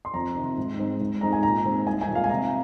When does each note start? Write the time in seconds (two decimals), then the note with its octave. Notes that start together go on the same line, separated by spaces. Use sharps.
0.05 C6
0.14 F2 A#5
0.35 C3 D#3
0.58 G#2
0.78 G#3 C4 D#4
1.01 G#2
1.21 G#3 C4 D#4 A#5
1.33 G#5
1.43 A#2 A#5
1.65 G#3 C4 D#4
1.86 C2 G#5
2.01 G#5
2.08 A#2 G#3
2.15 F5
2.24 G#5
2.29 C3 A#5